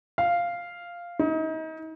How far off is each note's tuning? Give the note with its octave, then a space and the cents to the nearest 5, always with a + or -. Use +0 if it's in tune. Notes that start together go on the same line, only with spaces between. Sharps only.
F5 -5
D#4 +35